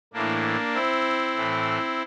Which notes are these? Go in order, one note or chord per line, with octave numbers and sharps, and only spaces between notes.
A2 E3 A#3 D4
C4 E4
A2 E3